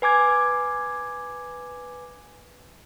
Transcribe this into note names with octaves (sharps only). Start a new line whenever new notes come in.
B4 G#5 D6 G#6